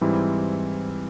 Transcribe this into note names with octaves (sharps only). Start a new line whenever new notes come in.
G#2 E3 G3 C4 E4